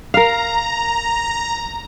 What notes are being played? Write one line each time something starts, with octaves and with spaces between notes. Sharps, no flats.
A#4 F5 A#5